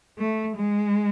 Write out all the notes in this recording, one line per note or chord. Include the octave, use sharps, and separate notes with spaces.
A3
G#3